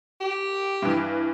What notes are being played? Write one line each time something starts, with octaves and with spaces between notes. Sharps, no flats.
G4
G2 E3